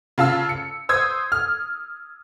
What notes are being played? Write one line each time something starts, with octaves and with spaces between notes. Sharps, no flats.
C#3 F4 A5 E6
C#7
C5 D#6 E6 G#6
F6